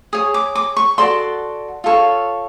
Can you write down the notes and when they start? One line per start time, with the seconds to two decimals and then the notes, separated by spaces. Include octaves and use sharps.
0.13 G#4 C#5 D#6
0.34 D6
0.55 D6
0.77 C#6
0.98 F#4 A4 D5 C6
1.84 F4 A4 C#5